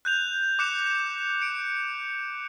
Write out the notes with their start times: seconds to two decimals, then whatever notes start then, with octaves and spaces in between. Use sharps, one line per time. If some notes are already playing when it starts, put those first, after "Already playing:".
0.05 F#6 G6 F7
0.59 D6 F#6 C#7 E7
1.42 C#7 D7